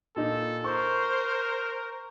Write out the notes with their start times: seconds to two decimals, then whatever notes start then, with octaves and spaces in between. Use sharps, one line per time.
0.16 A#2 D#4 A4
0.64 A#4 C5 C#6